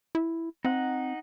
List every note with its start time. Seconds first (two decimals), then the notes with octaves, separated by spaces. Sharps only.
0.15 E4
0.65 C4 D#4 F#5